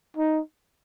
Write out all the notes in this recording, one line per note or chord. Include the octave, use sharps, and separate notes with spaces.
D#4